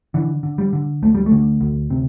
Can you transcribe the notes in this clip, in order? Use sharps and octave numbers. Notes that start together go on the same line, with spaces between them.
D3 E3
D3
G3
D3
D2 A3
G3
A3
D3
D2
C3